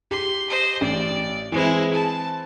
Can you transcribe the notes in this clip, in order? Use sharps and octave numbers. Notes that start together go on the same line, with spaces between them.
G4 C6
C5 D#5
A1 D5
E3 G#3 C4 E4
A5